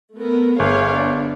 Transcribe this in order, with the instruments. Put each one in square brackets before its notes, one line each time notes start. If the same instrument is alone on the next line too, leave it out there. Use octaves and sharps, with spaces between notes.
[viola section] A3 B3 A#4
[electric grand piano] G1 [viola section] G#4 C#5 F5
[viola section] B3 D4